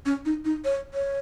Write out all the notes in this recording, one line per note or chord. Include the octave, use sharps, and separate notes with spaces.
C#4
D#4
D#4
C#5
C#5